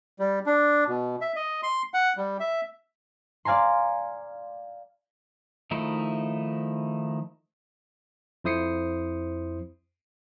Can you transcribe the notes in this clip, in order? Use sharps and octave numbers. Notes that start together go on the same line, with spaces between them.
G3
D4
B2
E5
D#5
C6
F#5
G3
E5
D5 F5 G#5 A#5 C6
D#3 F3 A3 D#4 E4
F2 E4 C5 D#6 C7 C#7